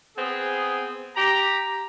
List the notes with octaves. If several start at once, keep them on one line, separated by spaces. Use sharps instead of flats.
B3 C4 G#4
G4 A#5